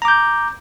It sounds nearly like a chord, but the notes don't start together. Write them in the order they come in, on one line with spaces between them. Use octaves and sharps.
A#5 D6 G6